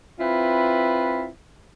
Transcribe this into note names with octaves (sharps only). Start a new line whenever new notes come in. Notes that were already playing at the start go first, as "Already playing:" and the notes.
C4 E4 F4 B4